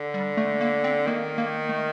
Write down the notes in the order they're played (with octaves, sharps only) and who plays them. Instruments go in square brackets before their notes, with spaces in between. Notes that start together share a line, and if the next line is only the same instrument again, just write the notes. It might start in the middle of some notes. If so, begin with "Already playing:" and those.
Already playing: [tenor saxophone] D3
[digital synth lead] G3
A3
A#3
C4
[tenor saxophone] D#3 [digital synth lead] A#3
[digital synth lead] A#3
A3